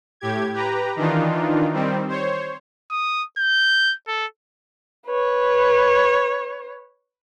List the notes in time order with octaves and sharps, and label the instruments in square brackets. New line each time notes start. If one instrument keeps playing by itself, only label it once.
[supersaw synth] A2 G4 G#6
G4 B4 A#5
D#3 E3 D4 D#4 F4
D#3 G3 C4
C5 C#5
[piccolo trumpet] D#6
G6
A4
[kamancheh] B4 C#5